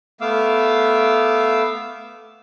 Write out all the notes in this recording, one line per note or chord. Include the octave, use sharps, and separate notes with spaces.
A3 B3 F5 D6 E6